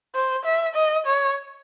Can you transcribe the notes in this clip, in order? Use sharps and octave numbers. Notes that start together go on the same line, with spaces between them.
C5
E5
D#5
C#5